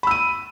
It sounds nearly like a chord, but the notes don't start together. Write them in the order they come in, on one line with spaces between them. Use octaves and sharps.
B5 E6 D#7